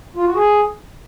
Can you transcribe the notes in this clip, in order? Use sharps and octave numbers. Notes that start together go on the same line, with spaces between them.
F4
F#4
G#4